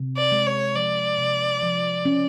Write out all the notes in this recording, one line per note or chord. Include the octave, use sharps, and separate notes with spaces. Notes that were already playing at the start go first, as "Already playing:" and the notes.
Already playing: C3
D5
G#3
C#5
F3 D5
C3
F3
C#4